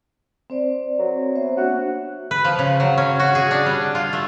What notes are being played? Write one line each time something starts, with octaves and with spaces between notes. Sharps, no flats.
C4 C5 D5
F#3
B3 C5 E5
A#3 D4 F#4 E5
B4
F3
C#3
F#3
C#4
F#4
G#4
D4
G3
F4
A3